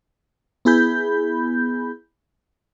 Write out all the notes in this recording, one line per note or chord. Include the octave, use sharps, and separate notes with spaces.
B3 E4 G#4 B5 G6